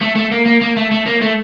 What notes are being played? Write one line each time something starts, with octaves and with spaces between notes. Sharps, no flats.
A3
A3
A#3
A#3
A#3
A3
A3
A#3
A3